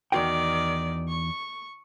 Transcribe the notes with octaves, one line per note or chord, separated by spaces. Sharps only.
E2 D#3 F#4 D5 G5
C#6